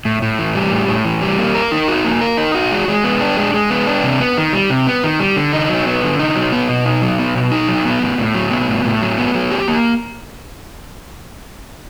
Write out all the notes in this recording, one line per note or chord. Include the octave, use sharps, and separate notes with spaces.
A2
A2
E3
G3
A2
A2
E3
G3
A#3
A#4
D#4
F#4
A#3
A#4
D#4
F#4
G#3
G#3
B3
D4
G#3
G#3
B3
D4
C3
B3
D#3
G3
C3
B3
D#3
G3
D3
D#4
F#3
B3
D3
D#4
F#3
B3
B2
D#4
F#3
B3
B2
D#4
F#3
B3
A2
A2
F#3
B3
A2
A2
F#3
B3
F#3
G4
A#3